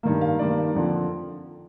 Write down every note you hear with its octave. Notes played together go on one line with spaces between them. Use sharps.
G2 D#3 A#3
F5
G2 D#3 A#3 D5
F2 D3 F3